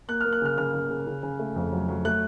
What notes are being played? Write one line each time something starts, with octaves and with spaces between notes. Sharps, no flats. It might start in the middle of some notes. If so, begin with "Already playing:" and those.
A#3 F#6
F6
A#3
F#6
C#3 F6
C#3 F6
C#3
C#3
C#3
C#3
A3
F2
F#3
F#3
A3 F#6